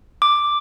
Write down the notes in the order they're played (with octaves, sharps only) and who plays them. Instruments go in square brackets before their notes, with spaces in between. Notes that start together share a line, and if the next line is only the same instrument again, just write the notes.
[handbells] D6